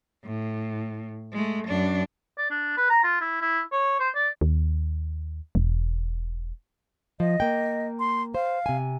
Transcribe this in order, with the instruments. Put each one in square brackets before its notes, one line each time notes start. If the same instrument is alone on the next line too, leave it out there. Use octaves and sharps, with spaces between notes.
[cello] A2
G#3 A3
F#2 D4
[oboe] D5
D4
B4
A#5
F4
E4
E4
C#5
C5
D5
[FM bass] D#2
E1
[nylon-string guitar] F3 [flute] D#5
[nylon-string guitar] A#3 G5
[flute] C6
[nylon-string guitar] C5 [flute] F5
[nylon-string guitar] C3 G#5